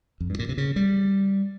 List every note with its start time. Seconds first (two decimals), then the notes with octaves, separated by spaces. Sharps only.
0.20 F2
0.30 G2
0.39 A#2
0.49 C3
0.58 C#3
0.76 G3